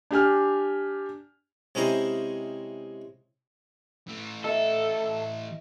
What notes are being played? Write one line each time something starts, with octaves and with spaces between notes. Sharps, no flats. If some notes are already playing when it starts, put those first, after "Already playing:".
D4 G4 G#5 F6
C3 G#3 C#4 E4 C5 A#5
E3 A3
A4 D#5 E5